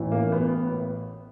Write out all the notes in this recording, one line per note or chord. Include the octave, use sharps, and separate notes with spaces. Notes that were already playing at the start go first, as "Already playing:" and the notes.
Already playing: A1 A2 E3
A#3
B3